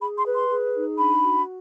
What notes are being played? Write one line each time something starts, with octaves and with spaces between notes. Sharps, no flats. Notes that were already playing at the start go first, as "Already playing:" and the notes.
G#4 B5
C6
B4
C6
G#4
D#4
D4 B5
F#4